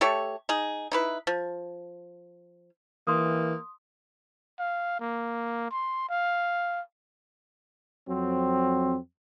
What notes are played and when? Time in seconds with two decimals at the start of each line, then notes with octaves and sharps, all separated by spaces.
0.01 A3 G4 A4 C#5
0.49 D#4 G#4
0.92 D#4 E4 B4
1.27 F3
3.07 E3 A#3 C6 D#6
4.59 F5
5.00 A#3
5.70 C6
6.09 F5
8.08 F2 F#3 C4